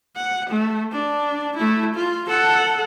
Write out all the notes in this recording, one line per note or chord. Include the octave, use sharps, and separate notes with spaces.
F#5
A3
D4
A3 E4
F4
A4 F#5